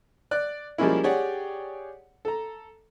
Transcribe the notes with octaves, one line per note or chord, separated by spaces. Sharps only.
D5 F#6
F3 G3 G#3 A#3 C#4 E4
G4 G#4 C#5 D5 F#5 G5
A4 A#5